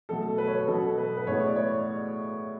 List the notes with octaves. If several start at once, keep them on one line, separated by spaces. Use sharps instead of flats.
B2 F#3 A3 A4
B4
C#5
B4
B2 F#3 B3 A4
B4
B4
A2 G#3 B3 C#5
D5
C#5